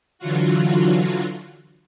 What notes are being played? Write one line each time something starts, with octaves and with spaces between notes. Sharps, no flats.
D3 E3 F#3 F4 F#4